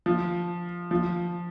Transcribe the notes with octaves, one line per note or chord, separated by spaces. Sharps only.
F3
F3